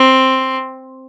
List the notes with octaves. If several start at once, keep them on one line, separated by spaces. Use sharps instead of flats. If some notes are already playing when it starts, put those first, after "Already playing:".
Already playing: C4